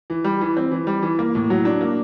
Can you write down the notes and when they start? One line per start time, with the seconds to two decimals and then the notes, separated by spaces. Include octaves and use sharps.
0.10 E3
0.24 G3
0.41 E3
0.57 C4
0.71 E3
0.87 G3
1.02 E3
1.19 A#3
1.35 A2
1.50 F#3
1.65 D4
1.81 A#3